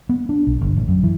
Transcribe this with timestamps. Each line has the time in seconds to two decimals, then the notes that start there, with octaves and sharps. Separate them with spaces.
0.09 B3
0.29 D4
0.47 B1
0.61 G1
0.76 A1
0.88 F#2
1.03 E3